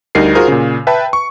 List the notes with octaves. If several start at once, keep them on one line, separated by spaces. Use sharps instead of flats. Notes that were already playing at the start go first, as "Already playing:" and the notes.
D2 G3 D#4 A#4 C7
F4 F#4 G#4 A#4 C5
A#2 C#3
B4 E5 G5 A5 B5
C#6